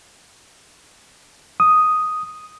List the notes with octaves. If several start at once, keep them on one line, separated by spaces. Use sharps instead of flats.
D#6